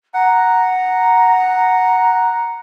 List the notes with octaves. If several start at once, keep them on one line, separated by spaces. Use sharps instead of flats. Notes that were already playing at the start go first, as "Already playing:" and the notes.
F#5 A#5